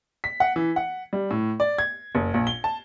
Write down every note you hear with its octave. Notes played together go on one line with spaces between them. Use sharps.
B6
F#5
E3
F#5
G3
A2
D5
G#6
F#1
A#1
G7
A5